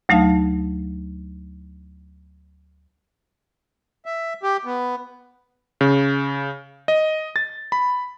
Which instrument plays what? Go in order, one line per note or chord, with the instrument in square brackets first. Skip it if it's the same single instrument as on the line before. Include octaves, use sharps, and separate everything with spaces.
[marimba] D2 F#3 A3 D#4 F5 A5
[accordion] E5
G4
B3
[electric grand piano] C#3
D#5
A6
B5